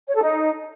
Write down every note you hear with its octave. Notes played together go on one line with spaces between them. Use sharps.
C#5
A4
D#4